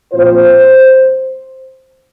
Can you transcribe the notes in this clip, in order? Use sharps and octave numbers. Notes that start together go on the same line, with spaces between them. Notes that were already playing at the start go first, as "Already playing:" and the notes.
A#2 F3 C4 F4 C5